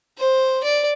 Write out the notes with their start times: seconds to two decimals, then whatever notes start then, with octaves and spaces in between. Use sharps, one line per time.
0.19 C5
0.63 D5